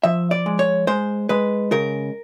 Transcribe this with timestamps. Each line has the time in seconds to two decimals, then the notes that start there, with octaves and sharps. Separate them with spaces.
0.04 F3 E5
0.31 D5
0.46 G#3
0.59 C#5
0.87 G#3 C5
1.29 G#3 B4
1.71 C#3 A#4